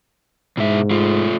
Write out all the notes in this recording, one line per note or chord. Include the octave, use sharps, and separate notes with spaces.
G#2 B2 E4 E5
A3 F4